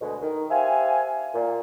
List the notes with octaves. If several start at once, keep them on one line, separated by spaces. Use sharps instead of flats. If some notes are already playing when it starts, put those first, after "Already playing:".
D2 B2 G#3
D#3
G4 C5 E5 F5 G#5
A#2